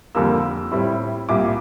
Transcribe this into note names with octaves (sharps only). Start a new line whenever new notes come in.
F2 D3 G3 A#3 E6
A2 G3 C4 E4
C2 A#2 G3 D6